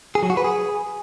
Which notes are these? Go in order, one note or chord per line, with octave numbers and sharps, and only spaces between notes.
G#4
F#3
F#4
B4
G#4